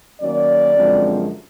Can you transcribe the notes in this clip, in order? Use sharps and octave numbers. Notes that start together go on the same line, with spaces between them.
D#3 F#3 A#3 C#4 D5
F#2 D3 F3 G#3 C4